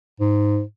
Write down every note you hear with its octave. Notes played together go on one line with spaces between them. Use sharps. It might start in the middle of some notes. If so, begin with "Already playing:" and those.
G#2